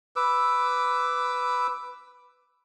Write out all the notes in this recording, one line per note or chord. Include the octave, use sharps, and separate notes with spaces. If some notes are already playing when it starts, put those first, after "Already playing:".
B4 D6 E6